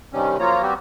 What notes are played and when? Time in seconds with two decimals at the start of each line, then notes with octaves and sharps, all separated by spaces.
0.13 G2 C3 D#3 G3 C#4
0.40 F3 F#3 A#3 F4 C#5 A#5
0.63 G3 B3 C4 F#4 G4